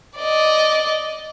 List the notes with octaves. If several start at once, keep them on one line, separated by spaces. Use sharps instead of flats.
D5 D#5